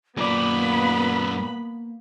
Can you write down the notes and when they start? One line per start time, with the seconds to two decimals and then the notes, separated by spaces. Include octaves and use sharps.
0.17 F#2 A#2 A#3 B3 D#4 D5 B5